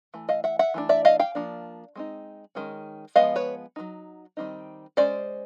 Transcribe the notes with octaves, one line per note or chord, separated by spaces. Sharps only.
E3 A3
D#5 F5
E5 F#5
E5 F#5
E3 A3 D4
D5 E5
D#5 F5
F5 G5
F3 A#3 D4
G#3 C4 D#4
D#3 G#3 C#4
F3 G#3 B3 D#5 F5
B4 C#5
F#3 A#3 D#4
D#3 G3 C4 D#4
G#3 C#4 C5 D5